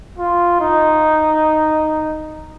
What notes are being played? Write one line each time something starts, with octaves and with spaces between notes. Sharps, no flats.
F4
D#4